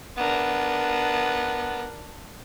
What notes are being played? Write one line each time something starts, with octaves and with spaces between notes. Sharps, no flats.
B3 D4 A#4